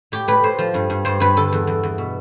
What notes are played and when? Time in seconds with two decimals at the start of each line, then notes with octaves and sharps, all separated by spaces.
0.12 A2 G4
0.28 A2 B4
0.44 A2 C5
0.58 F3
0.74 G2
0.90 G2
1.05 G2 C5
1.20 G2 B4
1.37 D3 A4
1.52 E2
1.67 E2
1.83 E2
1.98 B2